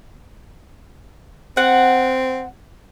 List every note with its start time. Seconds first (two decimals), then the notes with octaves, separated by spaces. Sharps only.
1.57 C4 F#5